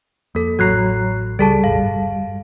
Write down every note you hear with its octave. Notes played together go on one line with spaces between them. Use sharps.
F2 A#3 A4
A1 F#3 F#4 C#5 A#5 F#6 C7
C#2 G3 G#4 A4 A5
E1 A1 F5
G1